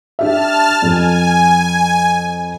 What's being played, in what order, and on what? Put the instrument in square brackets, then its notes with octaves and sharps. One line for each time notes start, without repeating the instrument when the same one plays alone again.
[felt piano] D4 G4 E5 [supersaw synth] A5 F6
[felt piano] F2 [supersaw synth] G#5